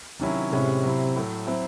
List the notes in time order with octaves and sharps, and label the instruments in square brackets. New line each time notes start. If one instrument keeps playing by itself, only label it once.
[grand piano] C3 D#3 F#3 C#4 E4
[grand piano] A2 G#3 C#4 E4 [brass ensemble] C3
[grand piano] F#3 C4 E4
A2 F#3 A3
F#3 C4 E4